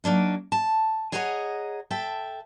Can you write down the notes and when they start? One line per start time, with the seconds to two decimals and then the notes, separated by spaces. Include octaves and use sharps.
0.04 F#3 A#3 D4 D#4
0.52 A5
1.12 G#4 C#5 D#5 F#5 A5 A#5
1.91 A4 E5 G5